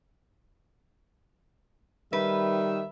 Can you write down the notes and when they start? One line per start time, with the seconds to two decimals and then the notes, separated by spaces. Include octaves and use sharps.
2.13 D#3 G3 B4 E5